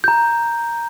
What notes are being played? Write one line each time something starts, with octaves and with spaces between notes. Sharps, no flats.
A#5 G6